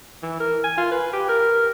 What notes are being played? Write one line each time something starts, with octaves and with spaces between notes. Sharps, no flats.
E3
A#4
G#5
F4
B4
G4
A#4